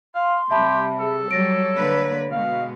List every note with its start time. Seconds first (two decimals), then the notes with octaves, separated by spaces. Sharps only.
0.15 F5 C6
0.51 C3 G3 G4 E5 A5 B5
0.99 G#4 A4
1.31 F#3 G3 C#5 A6 A#6 D7
1.76 D3 A#3 B4
2.32 B2 G#3 F5